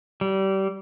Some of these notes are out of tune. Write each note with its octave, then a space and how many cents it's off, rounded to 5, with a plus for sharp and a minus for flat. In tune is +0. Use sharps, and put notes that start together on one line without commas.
G3 -25